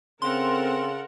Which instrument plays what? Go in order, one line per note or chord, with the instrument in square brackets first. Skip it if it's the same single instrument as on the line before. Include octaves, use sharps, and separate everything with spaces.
[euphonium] C#3 [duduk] C4 [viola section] A4 A#4 F#5 [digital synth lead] C6